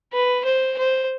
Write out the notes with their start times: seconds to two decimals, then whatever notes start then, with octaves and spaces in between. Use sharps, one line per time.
0.13 B4
0.45 C5
0.78 C5